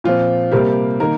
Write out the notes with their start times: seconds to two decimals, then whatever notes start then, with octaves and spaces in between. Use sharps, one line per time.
0.04 A#2 F3 C4 F4
0.52 C3 G3 A#3 G4
1.00 D#3 A#3 A#4